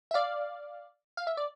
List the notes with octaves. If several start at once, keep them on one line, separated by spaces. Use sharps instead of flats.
E5
D5 F5
F5
E5
D5